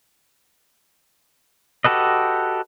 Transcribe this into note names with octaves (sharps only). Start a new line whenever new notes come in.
F#4 G4 A4 B4 D#5